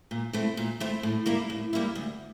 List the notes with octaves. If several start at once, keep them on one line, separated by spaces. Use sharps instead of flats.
A#2
A3 C4 E4
A#2
A3 C4 E4
A2
G3 A#3 E4
A2
G3 A#3 E4
D2